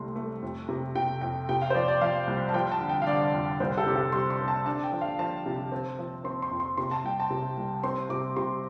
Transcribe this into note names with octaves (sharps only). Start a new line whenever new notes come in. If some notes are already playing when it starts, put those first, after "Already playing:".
Already playing: C2 C3 A3 C6
A3
F2
C3
C3 G5
F2 G5
C3 G5
F5
C5
F3 D5
D5
F3 F5
C2
A5
F3 G5
A5
D3
G5
F5
D3 D5
F2
C2 C5
A4
C3 G4
A4
G3 C6
C6
C4
A5
D4 A5
G5
F3
F5
F3 A5
C3
C4
F3
C4 C6
C6
F2
C6
C3 C6
A5
C2 G5
A5
C3
C2
C4 C6
C3 D6
C3 C6